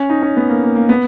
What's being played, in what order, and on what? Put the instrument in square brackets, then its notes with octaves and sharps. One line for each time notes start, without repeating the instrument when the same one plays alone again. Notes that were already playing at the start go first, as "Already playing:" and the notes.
Already playing: [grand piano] C#4
D#4
C#4
B3
A#3
A#3
A#3
B3